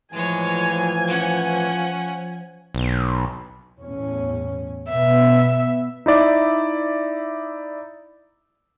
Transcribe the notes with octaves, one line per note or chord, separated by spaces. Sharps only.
A2 E3 F3 G#3 C#5 G#5
C#4 F#5
B1
E2 A2 C#4
B2 B3 E5
D#4 E4 D5 E5